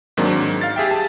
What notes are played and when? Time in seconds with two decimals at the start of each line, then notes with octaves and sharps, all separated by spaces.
0.17 G#2 D#3 F#3 A#3 C4 D4
0.32 G#2
0.61 F5 A6
0.76 G4 G#4 E5 G5
0.91 A5